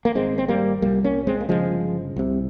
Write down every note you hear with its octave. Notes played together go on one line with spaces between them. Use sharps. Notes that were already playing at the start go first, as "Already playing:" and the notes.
A#3
G#1 G#2 G#3 C4
C4
G3 A#3
C2 A#2 G3 A#3
A#3 C#4
G#3 C4
A#3
G1 F2 C#3 F3 G#3
C2 C3